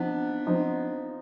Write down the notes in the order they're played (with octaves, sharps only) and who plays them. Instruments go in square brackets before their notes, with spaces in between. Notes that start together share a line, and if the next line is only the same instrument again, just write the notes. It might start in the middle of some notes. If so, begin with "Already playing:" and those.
Already playing: [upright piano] F3 C4 D#4 [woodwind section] B3 D4
[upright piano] F3 C4 D#4